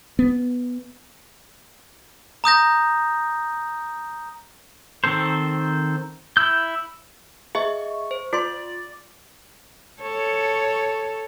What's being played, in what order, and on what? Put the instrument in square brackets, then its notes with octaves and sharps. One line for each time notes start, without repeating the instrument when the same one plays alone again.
[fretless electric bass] B3
[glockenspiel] A#5 D#6 G6 A#6
[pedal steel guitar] D#3 C4 A4 C5
E4 E6 G6
[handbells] G#4 D#5 E5 [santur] C#6
[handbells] C5
[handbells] F4 C6 [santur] D5
[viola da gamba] A4 C#5